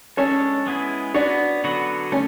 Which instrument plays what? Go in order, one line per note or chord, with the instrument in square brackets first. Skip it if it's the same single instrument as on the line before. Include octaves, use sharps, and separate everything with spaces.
[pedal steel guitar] G#3 D4 A4 C#5 [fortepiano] C#4
[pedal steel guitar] G#3 B3 E4 G#4
[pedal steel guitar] B3 F#4 C#5 [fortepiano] D4
[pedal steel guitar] D3 F#3 B3 F#4 B4
[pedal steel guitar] A3 [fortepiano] C#4